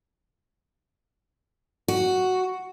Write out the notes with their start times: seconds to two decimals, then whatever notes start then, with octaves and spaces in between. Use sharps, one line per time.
1.88 F#4